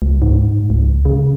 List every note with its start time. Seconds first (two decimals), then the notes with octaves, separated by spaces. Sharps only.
0.02 C#2
0.22 G#2
0.70 C#2
1.05 C#3